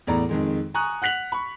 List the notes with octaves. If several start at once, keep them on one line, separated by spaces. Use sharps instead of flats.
E2 A2 D5 A#5
F2 D#3 G#3
G#5 A#5 C#6 D#6 F#6
F#5 F#6 B6 F7 F#7
B5 C#6